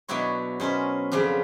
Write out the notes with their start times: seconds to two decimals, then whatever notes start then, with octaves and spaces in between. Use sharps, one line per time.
0.08 B2 F#3 D4 E4 F#4 C#5
0.60 B2 C#4 A#4 C5
1.12 F2 C#3 F3 B3 D4